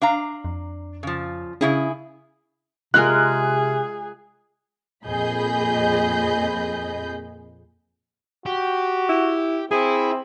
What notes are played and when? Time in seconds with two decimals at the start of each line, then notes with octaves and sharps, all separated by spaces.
0.02 D4 F5 A#5
0.45 F2
1.03 C#3 F3
1.61 C#3 C#4 E4 G#4
2.94 C3 G#3 F4 G#4 A#4 F#6
5.05 F2 A#2 G#4 D#5 B5 G6
8.46 F#4 G4
9.09 E4
9.71 C4 E4 G#4